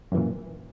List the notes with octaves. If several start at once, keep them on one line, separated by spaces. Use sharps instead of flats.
F#2 A#2 E3